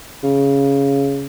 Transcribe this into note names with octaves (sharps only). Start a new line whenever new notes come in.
C#3